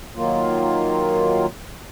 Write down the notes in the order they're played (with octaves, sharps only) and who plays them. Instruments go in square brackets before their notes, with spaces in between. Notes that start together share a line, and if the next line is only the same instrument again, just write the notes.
[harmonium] D#3 F#3 A#3 F4